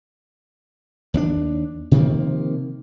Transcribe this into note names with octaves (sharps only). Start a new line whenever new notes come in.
D#2 G#3 D4
C3 D#3 F3 A#3